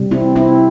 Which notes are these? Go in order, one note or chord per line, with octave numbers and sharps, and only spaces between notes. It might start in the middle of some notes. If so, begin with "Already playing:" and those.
Already playing: C3 G3
C4 E4
C4 E4